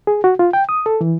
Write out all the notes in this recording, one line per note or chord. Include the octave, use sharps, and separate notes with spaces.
G#4
F#4
F4
G5
D#6
A4
E3